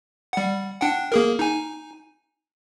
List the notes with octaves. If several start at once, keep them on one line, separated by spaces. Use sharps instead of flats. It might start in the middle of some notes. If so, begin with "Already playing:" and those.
G3 F#5
D4 F#5 G5
A#3 G#4 A#4
D#4 G#5